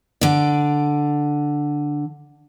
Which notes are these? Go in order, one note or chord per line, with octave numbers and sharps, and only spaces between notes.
D3 D5